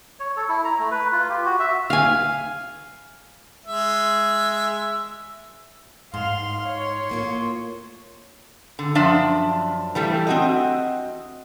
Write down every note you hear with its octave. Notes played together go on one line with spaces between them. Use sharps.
C#5
A4
E4
A#5
A3
B4
F4
G4
F#4
E5
F5 G#5
G#3 E5
G#2 F5 C6 F6
C#5
A2 A#3 F4
D3
F#2 F3 D4 D5 E5
E3 G3 A3
C4 F#4 D#5